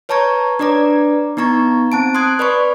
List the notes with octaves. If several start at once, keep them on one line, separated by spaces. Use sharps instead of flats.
B4 C#5 A5 A#5 C#6 G#6
D4 B4 D5 A#5 D6
B3 D#4 A#5 C#6 G#6
C4 A5 D7
C6 D#6 F#6 G#6
B4 D5 B5 C#6